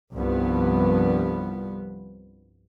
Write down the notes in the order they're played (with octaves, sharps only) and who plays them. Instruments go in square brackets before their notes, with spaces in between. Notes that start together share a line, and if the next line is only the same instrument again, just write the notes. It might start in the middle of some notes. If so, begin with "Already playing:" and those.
[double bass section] C2 G2 F3 B3